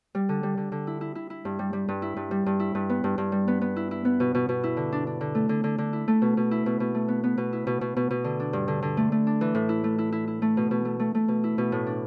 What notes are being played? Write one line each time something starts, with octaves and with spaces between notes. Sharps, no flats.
G3
D3
G3
D3
D3
E4
E4
E4
E4
G2
G3
G3
G2
E4
G2
G3
G2
E4
G2
B3
G2
G2
G3
B3
B3
E4
E4
B3
B2
B2
B2
E4
D3
D4
D4
D3
A3
D3
D3
D3
E4
A3
B2
B2
E4
B2
B2
A3
B3
B3
B2
E4
B2
B2
B2
B2
D3
D4
G2
D3
D3
A3
A3
D4
E3
A2
E4
A3
E4
E4
E4
A3
B2
B2
A3
A3
A3
B2
E4
B2
A2
D4